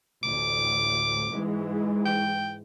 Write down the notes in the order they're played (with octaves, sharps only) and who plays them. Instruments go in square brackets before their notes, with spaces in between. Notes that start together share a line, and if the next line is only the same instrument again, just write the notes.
[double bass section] A1 D2 A2 [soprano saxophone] D6
[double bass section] G#2 E3 G#3
[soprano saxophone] G5